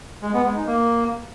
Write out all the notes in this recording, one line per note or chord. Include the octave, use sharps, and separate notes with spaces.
G#3
B3
G#3
D#4
A#3